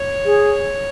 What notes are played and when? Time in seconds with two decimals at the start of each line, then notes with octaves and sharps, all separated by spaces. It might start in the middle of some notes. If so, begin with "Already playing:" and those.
Already playing: C#5
0.25 G#4